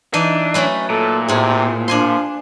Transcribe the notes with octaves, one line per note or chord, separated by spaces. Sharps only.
E3 D4 D#4
F#3 A3 C#4 B4
A#2 A4
A2 C3 G#4
F3 D4 G#5 C6